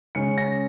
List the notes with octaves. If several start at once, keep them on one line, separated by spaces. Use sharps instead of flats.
C#3 G#3 C#4 C#7
A#6